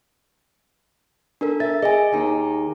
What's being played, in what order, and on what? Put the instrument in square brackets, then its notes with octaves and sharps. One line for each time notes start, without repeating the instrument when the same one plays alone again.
[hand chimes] D4 A4 A#4
[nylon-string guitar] E5 [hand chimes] A6
[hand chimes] G#4 G#5 [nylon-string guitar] D#5
[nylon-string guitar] D#2 D#4